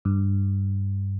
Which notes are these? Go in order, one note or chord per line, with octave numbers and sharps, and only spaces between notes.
G2